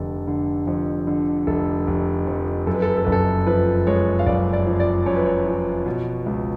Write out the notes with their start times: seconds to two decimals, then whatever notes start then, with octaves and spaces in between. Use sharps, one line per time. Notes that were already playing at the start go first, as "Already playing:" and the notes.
Already playing: F1 D3 A4
0.27 D3
0.67 F2
1.07 D3
1.47 F1 A4
1.87 F1
2.27 F2
2.67 F#2 A4
2.74 B4
2.82 A4
2.90 B4
2.97 A4
3.04 F#1 B4
3.12 A4
3.47 F3 B4
3.87 G#3 C#5
4.19 F5
4.26 F#1 D5
4.53 D5
4.66 F3
4.80 D5
5.06 F#2 C#5
5.16 B4
5.25 C#5
5.46 F3
5.86 B2
6.26 C#2